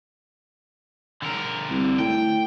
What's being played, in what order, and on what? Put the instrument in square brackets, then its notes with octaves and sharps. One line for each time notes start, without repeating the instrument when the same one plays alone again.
[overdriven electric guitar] D3 A#4
[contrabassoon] C2
[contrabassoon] A2 [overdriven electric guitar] G5